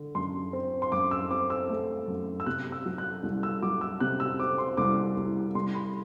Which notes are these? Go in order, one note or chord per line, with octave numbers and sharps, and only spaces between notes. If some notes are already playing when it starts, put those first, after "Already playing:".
Already playing: D3
F#2 C6
C4
C6
F#2 D6
E6
C4 D6
E6
A3
F#2
E6
C3 F#6
E6
F#3
F#6
C2
E6
F#3 D6
E6
C3 F#6
E6
C4 D6
C6
C2 D6
C2
C2 C6
B5